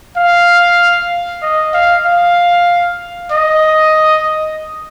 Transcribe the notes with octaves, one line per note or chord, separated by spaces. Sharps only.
F5
D#5
F5
F5
D#5